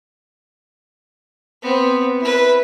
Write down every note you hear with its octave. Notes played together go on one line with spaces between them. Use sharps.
B3 C4
E4 B4